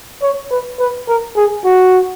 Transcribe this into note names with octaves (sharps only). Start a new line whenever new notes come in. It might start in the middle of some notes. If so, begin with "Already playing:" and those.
C#5
B4
B4
A#4
G#4
F#4